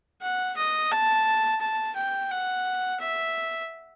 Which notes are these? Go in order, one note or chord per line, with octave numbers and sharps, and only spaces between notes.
F#5
D#5
A5
A5
G5
F#5
E5